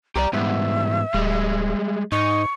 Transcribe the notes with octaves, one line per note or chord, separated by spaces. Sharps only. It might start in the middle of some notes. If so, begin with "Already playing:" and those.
C2 G4 C5 D5 A#5
G#2 E3 G3 B3 E5
D1 G3 G#3
G#2 D#4 C#6